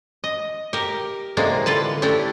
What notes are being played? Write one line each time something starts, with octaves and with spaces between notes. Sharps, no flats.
D#5
G4 A#4
A2 C3 G#3 A#3 D4
D3 F4 B4 A5
A3 D4 E4 G4